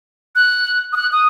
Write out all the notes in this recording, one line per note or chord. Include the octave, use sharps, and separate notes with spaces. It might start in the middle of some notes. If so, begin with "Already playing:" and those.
F#6
D#6
F#6
D#6